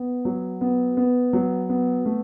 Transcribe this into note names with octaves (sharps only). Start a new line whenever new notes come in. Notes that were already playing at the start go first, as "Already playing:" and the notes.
Already playing: B3
F#3
B3
B3
F#3
B3
A3